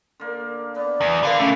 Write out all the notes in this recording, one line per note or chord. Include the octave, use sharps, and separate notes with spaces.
D3 A#3
B3 D5
E2
D3 A#4 F5 B5
B2 A3 C#4